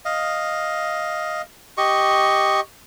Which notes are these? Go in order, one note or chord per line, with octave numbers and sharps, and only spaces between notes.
D#5 F5
G4 D#5 C#6